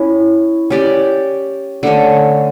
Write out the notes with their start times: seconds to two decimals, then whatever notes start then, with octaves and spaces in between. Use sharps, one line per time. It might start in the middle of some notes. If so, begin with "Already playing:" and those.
Already playing: C#4 E4
0.70 C#4 G4 D5
1.83 D3 A3 C#4